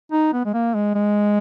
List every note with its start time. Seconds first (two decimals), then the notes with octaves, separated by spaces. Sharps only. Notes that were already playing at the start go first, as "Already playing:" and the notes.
0.12 D#4
0.33 B3
0.45 G#3
0.53 A#3
0.75 G#3
0.95 G#3